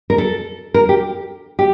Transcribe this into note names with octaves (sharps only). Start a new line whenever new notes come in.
A#4
A4
A#4
G4
G4